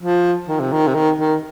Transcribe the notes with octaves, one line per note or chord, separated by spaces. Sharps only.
F3
D#3
C3
D#3
C3
D#3
D#3